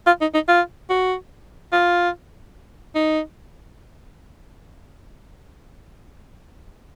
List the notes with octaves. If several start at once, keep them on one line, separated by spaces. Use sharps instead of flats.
F4
D#4
D#4
F4
F#4
F4
D#4